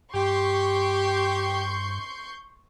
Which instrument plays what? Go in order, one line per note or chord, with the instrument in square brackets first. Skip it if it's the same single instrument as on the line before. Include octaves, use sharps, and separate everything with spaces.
[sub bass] G2 [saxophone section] G4 [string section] C6 C#6 G6